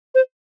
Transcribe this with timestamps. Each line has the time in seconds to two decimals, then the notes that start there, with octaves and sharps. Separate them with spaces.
0.15 C5